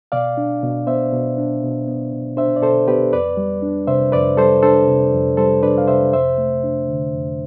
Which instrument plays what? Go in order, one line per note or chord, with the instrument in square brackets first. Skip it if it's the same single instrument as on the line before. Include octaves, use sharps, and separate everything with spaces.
[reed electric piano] B2 D5 F5
D4
B2
B3 C5 E5
B2
D4
B2
B3
B2
D4 C5 E5
D5
B2 A4 C5
B3 G4 B4
F2 B4 D5
G3
D4
C3 C5 E5
F2 B4 D5
G3 A4 C5
D4 A4 C5
C3
F2
G3 A4 C5
D4 B4 D5
F5
C3 C5 E5
F2 C5 E5
A3
D4
D3
F2